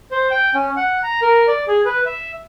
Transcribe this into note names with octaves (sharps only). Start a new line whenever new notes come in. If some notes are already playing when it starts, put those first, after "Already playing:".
C5
G5
C#4
F#5
A#5
A#4
D5
G#4
B4
E5